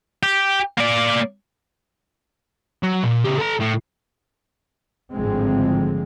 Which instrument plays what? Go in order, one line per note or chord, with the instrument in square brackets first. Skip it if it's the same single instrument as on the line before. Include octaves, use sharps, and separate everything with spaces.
[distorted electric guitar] G4
A#3 D5
F#3
A#2
C#2 G4
A4 A#5
A2
[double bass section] G#1 A2 D3 F3 G#3 C4